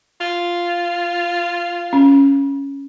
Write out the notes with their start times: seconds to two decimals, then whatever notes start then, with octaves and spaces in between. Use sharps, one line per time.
0.21 F4
1.93 C#4